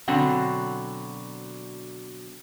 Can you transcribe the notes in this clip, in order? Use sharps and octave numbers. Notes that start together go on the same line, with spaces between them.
B2 D3 F#3 C4 F#5